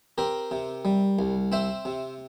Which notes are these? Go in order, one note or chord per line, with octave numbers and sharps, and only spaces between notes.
C4 G4 A#4
C3
G3
C2
C4 C5 E5
C3